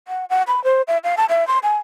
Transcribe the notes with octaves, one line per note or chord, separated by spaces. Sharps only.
F#5
F#5
B5
C5
E5
F5
A5
E5
C6
G#5